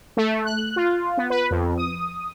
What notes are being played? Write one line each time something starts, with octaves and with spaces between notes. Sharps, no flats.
A3
F#6
F4
B3
B4
F2
D#6